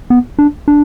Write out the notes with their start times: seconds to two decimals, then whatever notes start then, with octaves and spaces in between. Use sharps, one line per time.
0.10 B3
0.39 D4
0.68 D4